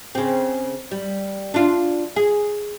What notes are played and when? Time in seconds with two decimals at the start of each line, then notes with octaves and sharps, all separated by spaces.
0.15 C#3 C4
0.91 G3
1.54 D4 F4
2.16 G#4